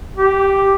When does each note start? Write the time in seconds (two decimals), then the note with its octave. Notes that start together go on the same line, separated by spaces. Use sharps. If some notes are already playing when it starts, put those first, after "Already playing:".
0.17 G4